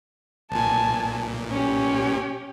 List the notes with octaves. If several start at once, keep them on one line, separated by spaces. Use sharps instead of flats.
B1 A#2 G#5 A5
C#4 G4